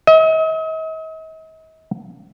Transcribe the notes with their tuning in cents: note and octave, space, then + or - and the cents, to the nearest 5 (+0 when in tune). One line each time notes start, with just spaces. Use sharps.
D#5 +45